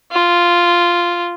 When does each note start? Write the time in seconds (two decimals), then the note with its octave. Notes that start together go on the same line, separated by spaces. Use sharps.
0.12 F4